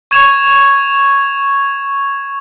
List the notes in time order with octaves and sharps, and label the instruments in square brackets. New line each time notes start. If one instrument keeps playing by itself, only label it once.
[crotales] C#6 G#6 E7 F7